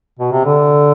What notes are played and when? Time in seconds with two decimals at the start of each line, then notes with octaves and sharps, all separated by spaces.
0.19 B2
0.32 C3
0.44 D3